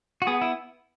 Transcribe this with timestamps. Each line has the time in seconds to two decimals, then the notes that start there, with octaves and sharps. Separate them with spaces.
0.22 F#4
0.27 B3 G#4
0.42 E4